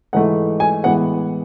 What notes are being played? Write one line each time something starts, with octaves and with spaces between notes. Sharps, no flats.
G#2 E3 A3 F#5
G#5
A2 E3 G#3 B3 F#5